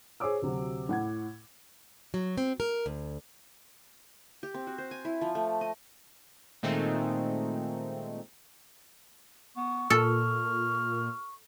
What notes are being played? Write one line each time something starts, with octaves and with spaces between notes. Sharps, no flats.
G#4 C5 C#5 D6 E6
D2 C3 F#3
A2 F#5 G#6
F#3
C4
A#4
D2
G4
C4
F#4
C5
G#5
E4
F3
A3
D#5
A#2 D#3 G#3 A3 C4 D#4
B3 C#6
A#2 A4 F6